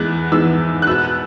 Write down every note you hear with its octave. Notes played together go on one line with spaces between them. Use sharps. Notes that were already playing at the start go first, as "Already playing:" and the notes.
Already playing: E2 E3 G#3 B3 F#6
E2 E3 G#3 B3 E6
F#6
B2 B3 E6